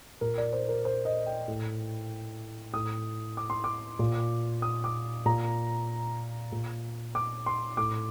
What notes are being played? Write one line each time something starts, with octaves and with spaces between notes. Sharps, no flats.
A#2 A#4
D5
C5
A#4
C5
D#5
G5
A2
A2 D#6
D6
C6
D6
A#2
D#6
D6
A#2 A#5
A#2
D6
C6
A2 D6